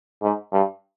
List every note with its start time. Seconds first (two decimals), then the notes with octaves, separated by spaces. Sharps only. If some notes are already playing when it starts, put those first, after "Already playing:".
0.22 G#2
0.53 G2